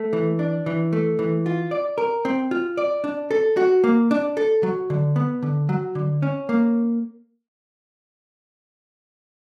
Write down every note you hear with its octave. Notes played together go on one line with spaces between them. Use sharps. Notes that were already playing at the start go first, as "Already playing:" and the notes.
Already playing: A3
E3
D4
E3
A3
E3
F4
D5
A#4
C4
F4
D5
D4
A4
F#4
A#3
D4
A4
F#3
D3
B3
D3
F#3
D3
C#4
A#3